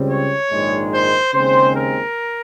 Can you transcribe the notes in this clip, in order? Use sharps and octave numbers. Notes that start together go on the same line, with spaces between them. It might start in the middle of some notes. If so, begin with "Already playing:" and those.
Already playing: C#2 C#3 G3 C4
C#5
A#1 G#2 D#3 G#3
C5
D#2 C#3 G#3 C4 C5
A#4